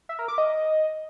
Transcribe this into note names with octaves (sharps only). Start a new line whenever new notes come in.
E5
A#4
D6
D#5